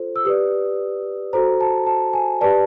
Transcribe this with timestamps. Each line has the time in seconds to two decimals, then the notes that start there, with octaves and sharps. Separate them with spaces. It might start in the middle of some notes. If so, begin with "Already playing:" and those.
Already playing: F4 A4 C5
0.16 E6
0.25 G4 B4 D5 D#6
1.33 F#4 A4 C5 A#5
1.61 A5
1.86 A5
2.13 G#5
2.41 G4 B4 D5 A5